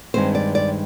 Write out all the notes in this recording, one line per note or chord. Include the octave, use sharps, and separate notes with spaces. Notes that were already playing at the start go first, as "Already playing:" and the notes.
G2 D#3 G#3 C4 C5
D5
D5